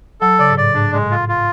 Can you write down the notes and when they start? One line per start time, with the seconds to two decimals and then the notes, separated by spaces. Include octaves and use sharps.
0.21 F#3 A4
0.39 C#3 D5
0.50 G#2
0.57 A2 D5
0.75 G#2 D4
0.93 G#3
1.02 A2
1.11 F4
1.29 F4